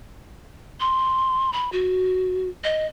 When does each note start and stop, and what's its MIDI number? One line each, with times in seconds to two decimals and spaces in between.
0.80 1.50 84
1.53 1.70 83
1.72 2.49 66
2.64 2.86 75